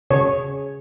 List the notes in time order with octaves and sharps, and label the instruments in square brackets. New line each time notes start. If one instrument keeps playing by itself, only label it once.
[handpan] C#3 [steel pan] C#5